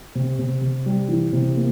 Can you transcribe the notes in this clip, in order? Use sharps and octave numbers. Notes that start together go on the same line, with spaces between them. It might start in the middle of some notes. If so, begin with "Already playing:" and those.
C3
C3
C3
G3
E3
C3
A#3